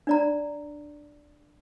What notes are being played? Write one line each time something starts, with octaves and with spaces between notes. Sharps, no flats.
D4 D5 A#5